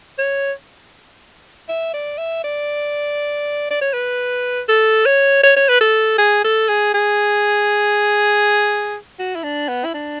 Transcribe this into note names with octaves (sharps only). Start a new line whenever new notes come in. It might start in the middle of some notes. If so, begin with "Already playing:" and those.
C#5
E5
D5
E5
D5
D5
C#5
B4
A4
C#5
C#5
C#5
B4
A4
G#4
A4
G#4
G#4
F#4
E4
D4
B3
E4
D4